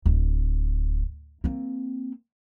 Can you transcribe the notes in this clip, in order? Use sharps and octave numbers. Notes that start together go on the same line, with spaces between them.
D1
A#3 C4